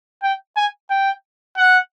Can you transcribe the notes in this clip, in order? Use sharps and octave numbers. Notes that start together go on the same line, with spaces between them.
G5
G#5
G5
F#5